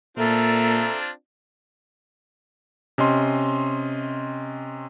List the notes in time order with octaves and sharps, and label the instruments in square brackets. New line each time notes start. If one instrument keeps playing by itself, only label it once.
[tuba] A#2 [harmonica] C4 D4 F4 [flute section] A4 E5 A#5
[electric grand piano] C3 C#4 D#5 C6